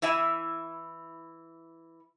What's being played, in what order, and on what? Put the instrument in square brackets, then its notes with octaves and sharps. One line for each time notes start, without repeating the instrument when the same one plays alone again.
[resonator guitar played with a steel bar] E3 E4 E5 G#5